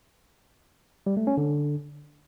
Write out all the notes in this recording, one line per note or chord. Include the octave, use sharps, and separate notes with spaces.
G3
A3
C#4
D3